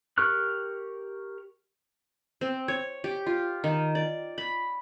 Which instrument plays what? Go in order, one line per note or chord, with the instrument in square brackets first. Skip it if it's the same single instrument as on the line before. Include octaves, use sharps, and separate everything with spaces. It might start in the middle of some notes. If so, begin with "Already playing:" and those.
[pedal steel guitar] G4 A#4 C#6 F6 F#6
[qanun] C4
C#5
G4
F4
D#3
D5
B5